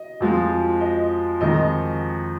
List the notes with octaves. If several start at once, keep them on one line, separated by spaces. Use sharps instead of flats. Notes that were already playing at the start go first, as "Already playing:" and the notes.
Already playing: D#5
F2 F3 G#3
D#5
F2 D#3 G#3 D#5